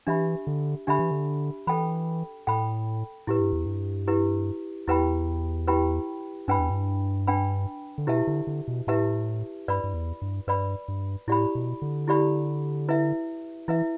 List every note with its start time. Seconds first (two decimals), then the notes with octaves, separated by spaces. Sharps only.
0.07 E3 D4 G4 E5 B5
0.47 D3
0.87 D3 D4 G4 E5 B5
0.99 E3
1.11 D3
1.67 E3 A4 G5 B5
2.47 A2 A4 G5 B5
3.27 A2 E4 G4 B4
3.40 G2
3.53 E2
3.66 G2
4.08 E4 G4 B4
4.87 E2 E4 G4 B4 G5 B5
5.68 E4 G4 B4 G5 B5
6.48 G2 D4 B4 G5 B5
6.59 E2
6.70 G2
7.27 D4 B4 G5 B5
7.98 D3
8.07 B2 E4 G4 B4 E5 A5
8.27 D3
8.47 D3
8.68 B2
8.87 A2 E4 G4 B4 E5 A5
9.68 G2 B4 D5 B5
9.84 G2
9.94 E2
10.22 G2
10.47 G2 B4 D5 B5
10.88 G2
11.27 A2 E4 G4 D5 B5
11.55 B2
11.82 D3
12.08 E4 G4 D5 B5
12.88 E4 B4 E5
13.68 E3 E4 B4 E5